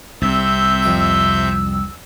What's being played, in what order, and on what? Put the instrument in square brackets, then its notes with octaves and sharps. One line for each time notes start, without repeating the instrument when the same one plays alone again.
[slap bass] C2 [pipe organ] C3 E5 G6 [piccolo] E6
[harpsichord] F2 G5